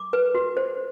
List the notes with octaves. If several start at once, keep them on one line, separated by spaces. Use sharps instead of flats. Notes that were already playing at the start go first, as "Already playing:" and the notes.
Already playing: D6
B4
F#4
C5